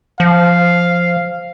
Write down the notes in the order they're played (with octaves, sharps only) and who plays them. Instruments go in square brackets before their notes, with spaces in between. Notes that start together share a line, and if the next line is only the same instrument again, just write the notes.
[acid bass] F3 [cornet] F5